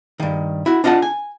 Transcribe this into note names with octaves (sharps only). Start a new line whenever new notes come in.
G2 D#3
E4 F#4
D4 F4 D#5 F#5 A5
G#5